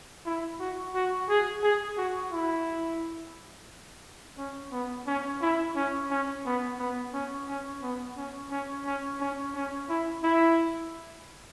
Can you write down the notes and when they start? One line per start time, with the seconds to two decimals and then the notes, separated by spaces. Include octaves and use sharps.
0.26 E4
0.60 F#4
0.95 F#4
1.29 G#4
1.63 G#4
1.98 F#4
2.32 E4
4.38 C#4
4.72 B3
5.07 C#4
5.42 E4
5.76 C#4
6.11 C#4
6.46 B3
6.79 B3
7.14 C#4
7.48 C#4
7.82 B3
8.17 C#4
8.51 C#4
8.86 C#4
9.21 C#4
9.55 C#4
9.89 E4
10.23 E4